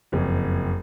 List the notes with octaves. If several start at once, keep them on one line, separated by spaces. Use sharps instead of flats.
F#1 F2